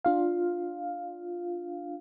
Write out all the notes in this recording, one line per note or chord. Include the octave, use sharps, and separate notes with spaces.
D4 F4 F5